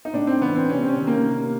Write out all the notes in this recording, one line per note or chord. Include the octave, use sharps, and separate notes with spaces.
D#4
A2 D4
C4
E3 B3
C4
C3 C#4
C4
C#4
D#3
A#3
C3